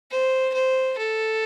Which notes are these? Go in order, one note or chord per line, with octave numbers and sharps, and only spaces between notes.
C5
C5
A4